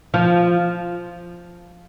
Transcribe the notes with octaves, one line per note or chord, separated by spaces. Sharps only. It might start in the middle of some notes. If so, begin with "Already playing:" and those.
F3